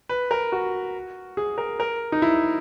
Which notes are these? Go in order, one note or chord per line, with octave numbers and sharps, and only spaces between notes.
B4
A#4
F#4
G#4
A#4
A#4
D#4
E4